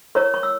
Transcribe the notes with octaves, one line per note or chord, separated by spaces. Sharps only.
E4 A#4 C#5 C#6
C#6
E6